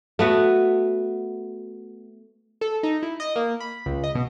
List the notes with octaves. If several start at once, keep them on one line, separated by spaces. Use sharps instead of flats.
A3 B3 F#4
A4
D#4
E4
D#5
A#3
B5
C#2
D#5
B2